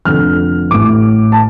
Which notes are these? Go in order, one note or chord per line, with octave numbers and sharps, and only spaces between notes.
F1 F2 D3 F6
A1 A2 D6
A5